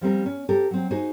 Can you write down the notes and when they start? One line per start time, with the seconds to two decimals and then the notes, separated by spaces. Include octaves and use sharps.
0.01 F3 G3 C4 A#4
0.26 C#4
0.49 C4 G4 A4 A#4
0.71 F#3 C4
0.91 D#4 F#4 G#4 C5